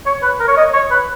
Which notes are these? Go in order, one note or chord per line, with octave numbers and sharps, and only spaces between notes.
C#5
B4
A#4
C#5
D#5
C#5
B4